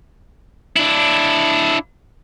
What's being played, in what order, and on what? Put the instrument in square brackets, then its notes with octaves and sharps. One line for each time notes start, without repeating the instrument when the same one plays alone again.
[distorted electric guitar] D4 E4